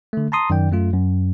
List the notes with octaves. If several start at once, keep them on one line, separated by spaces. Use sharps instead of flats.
D3 A3
A5 A#5 C6 D#6
F#2 D#3 D5 G5
F#2 A3 F4
F#2